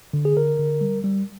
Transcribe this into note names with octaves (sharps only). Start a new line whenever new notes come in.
D3
G#4
D3 A#4
D3
G3
G3